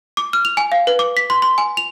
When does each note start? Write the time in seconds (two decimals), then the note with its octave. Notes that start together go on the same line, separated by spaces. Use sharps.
0.17 D6
0.33 F6
0.45 F7
0.57 G#5
0.72 F5
0.87 B4
0.99 D6
1.17 B6
1.30 C6
1.42 C6
1.58 G#5
1.77 F7